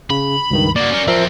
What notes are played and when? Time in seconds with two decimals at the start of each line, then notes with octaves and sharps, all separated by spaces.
0.10 C#3 B5
0.51 C#2 G2 D#3
0.76 A#3 F#4 D5
0.90 C#4 A#4
1.08 E2 F3 C4 A#4 E5